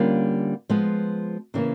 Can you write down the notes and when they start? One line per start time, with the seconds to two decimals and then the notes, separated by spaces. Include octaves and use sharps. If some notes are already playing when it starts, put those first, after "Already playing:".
Already playing: D3 G3 A#3 C#4 F4
0.69 F3 G#3 B3
1.54 C#3 E3 G3 A#3